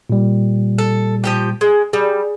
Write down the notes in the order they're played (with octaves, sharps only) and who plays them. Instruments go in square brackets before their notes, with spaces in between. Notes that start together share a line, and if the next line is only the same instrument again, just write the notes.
[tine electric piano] A#2 G3
[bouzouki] A4
F3 G4 G5
G#3
[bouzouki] G3 [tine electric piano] G#4